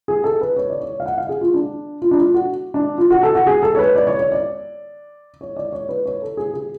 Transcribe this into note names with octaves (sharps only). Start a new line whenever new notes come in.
G#4
A4
B4
C#5
D5
C#5
F5
F#5
F5
G#4
F4
D4
F4
D4
F4
F#4
D4
F4
F#4
A4
F#4
G#4
A4
C#5
B4
D5
C#5
C#5
D5
C#5
D5
C#5
B4
C#5
A4
G#4
G#4